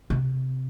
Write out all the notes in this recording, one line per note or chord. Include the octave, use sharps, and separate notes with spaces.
C3